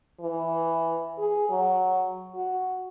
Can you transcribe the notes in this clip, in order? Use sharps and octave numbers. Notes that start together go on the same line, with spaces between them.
E3
G#4
F#3
F#4